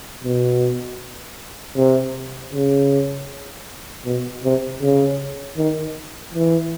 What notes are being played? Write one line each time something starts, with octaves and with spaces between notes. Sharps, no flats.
B2
C3
C#3
B2
C3
C#3
D#3
E3